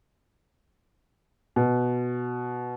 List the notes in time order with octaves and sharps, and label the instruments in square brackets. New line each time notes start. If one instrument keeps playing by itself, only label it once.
[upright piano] B2